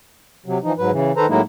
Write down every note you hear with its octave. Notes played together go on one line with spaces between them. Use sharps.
C3 F#3
E3 F3 D#4
G#2 F#3 B4
C#3 E3
D#3 A4 B4 C5 A#5
A2 F#3 G#3 A#3 D#4 E4